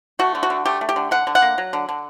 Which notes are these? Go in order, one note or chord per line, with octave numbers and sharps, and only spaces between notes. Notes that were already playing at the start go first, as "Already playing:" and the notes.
A3 F#4
D3
F#4
D3
A3 G4
A3
G4
D3
D3 F#5
D3
F#5
A#3
F#3
D3
D3